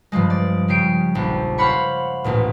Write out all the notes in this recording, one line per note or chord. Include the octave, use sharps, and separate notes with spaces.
G2 C#3 F3 G#3
D5
C#3 C#4 G4 C7 D7
F1 A#1
C5 C#5 F5 F#5 B5 C#6
A1 D2 A#2